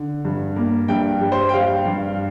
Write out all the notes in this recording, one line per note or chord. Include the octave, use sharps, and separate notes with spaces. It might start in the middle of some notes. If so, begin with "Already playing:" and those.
Already playing: D3
G2
A#3
G2 G5
G3
C5
G5
G3 F5
G2